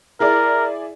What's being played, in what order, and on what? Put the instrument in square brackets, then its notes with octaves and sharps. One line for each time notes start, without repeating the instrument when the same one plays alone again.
[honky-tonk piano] E4 G#4 D5 [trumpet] A#4